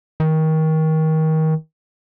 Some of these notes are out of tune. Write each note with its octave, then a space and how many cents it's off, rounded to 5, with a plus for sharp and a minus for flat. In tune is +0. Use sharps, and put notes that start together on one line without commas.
D#3 +25